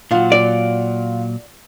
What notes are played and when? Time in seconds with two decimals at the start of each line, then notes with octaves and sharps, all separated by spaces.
0.11 A#2 F#3 F4 F5 F#5
0.32 D5